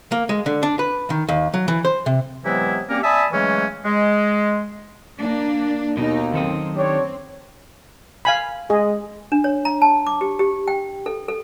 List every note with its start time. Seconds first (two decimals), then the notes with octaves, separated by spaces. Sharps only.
0.12 A#3
0.29 G#3
0.46 D3
0.63 D4
0.79 B4
1.10 D#3
1.29 D#2
1.54 F#3
1.68 E3
1.85 C5
2.06 C3
2.45 C3 E3 F#3 G#3 B3 E4
2.89 G3 A#3 C4 C#4 G4 A#4
3.04 D5 E5 G#5 A5 B5 D#6
3.32 C#3 E3 F#3 G#3 A3 C#4
3.85 G#3
5.17 A#3 D4
5.97 D#2 B2 D#4
6.34 F#2 D#3 C4 A4 D#5
6.76 C4 D4 G4 C#5
8.25 F5 G#5 B5
8.70 G#3 G#4 D#5
9.32 D4
9.44 C#5
9.65 A#5
9.82 A5
10.07 D6
10.21 G4
10.39 G4
10.68 G5
11.06 A4
11.28 A4